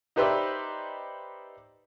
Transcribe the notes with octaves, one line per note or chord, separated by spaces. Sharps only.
D#4 G4 B4 C5 D5 E5